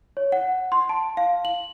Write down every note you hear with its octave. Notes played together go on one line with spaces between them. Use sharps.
C#5
F#5
C6
A5
F5
F#7